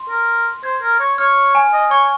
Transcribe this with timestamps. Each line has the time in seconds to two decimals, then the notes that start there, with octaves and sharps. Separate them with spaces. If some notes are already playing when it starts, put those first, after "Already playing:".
Already playing: C6
0.09 A#4
0.63 C5 G#6
0.82 A#4
1.00 C#5
1.18 C#5 F6
1.55 G#5
1.73 D#5
1.91 C#5 C#6